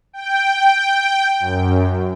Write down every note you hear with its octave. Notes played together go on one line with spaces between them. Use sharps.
G5
F#2